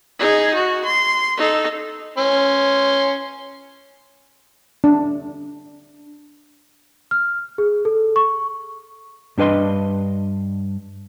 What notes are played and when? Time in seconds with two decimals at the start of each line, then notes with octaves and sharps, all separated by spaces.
0.19 D#4 G#4
0.54 F#4
0.85 C6
1.37 D#4 A4
2.18 C#4 C6
4.84 D4
7.11 F6
7.58 G#4
7.85 A4
8.16 C#6
9.38 G2 D4 B4 D#5 C6